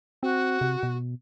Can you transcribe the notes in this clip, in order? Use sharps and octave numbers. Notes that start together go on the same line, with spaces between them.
C4 F#4
C3
B2